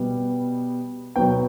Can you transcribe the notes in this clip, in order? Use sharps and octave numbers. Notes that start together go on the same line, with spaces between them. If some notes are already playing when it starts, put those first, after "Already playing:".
Already playing: B2 G3 B3
B2 F#3 B3 G5